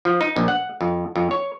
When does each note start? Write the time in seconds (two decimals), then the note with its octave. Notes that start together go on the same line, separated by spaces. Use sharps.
0.05 F3
0.21 D#4
0.36 A#1
0.48 F#5
0.81 F2
1.16 F2
1.31 C#5